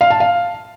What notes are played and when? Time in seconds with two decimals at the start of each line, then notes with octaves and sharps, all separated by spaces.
0.01 F5
0.10 A5
0.20 F5